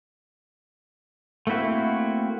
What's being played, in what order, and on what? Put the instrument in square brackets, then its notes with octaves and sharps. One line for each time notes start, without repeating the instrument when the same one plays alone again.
[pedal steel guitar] A3 A#3 C4 E4 F#4